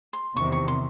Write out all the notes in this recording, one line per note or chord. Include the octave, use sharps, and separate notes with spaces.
C6
E2 C3 D#3 C#6
C#6
C6